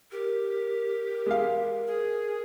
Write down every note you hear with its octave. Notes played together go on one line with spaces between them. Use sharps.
G4 A#4
G#3 F5
G#4